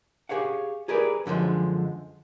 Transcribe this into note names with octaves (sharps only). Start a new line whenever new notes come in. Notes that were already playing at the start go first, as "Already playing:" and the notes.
G4 G#4 C#5 F5 F#5
G4 G#4 A#4 B4 D5
F#2 D3 E3 F3 G#3